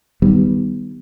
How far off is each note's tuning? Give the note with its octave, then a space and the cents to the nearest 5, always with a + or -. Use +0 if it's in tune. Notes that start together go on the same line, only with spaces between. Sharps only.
D#3 +0 G3 +0 B3 +5